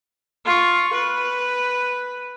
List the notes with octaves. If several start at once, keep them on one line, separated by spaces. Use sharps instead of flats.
F4 C#6
B4